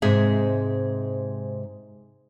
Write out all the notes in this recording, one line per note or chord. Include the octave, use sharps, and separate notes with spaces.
G#2 C3 G#3 G#4 E5